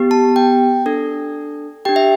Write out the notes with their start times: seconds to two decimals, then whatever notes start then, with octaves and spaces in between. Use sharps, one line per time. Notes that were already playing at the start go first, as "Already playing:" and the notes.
Already playing: B3 G4
0.11 A5
0.36 G5
0.86 D4 A4
1.85 D4 G4 G5
1.96 E5